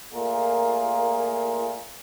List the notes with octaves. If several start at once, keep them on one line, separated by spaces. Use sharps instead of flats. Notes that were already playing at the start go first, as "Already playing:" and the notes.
A#2 A3 A#3 F4 G#4 A#4